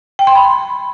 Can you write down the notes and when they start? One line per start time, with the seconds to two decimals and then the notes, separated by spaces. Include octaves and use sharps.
0.19 G5
0.27 C6
0.35 B5